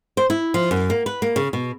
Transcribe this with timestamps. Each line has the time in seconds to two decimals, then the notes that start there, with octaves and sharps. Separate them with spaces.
0.17 C5
0.30 E4
0.54 F3
0.71 F#2
0.90 A#3
1.06 B4
1.22 A#3
1.36 C#3
1.53 B2